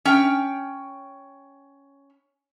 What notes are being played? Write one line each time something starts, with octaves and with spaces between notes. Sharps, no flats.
C#4 G5